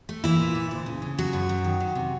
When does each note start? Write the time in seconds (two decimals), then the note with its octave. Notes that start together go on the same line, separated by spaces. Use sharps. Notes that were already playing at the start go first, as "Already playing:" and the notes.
0.09 A3
0.24 E3 A#3 E4
0.40 A#2
0.55 A#2
0.71 D2
0.86 C#3
1.02 C#3
1.18 F#2 F#3 F#4
1.33 F#2
1.49 F#2
1.64 D#3
1.80 D#3
1.95 C3